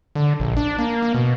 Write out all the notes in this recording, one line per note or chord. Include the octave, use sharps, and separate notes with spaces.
D3
A#1
D4
A#3
A#3
B2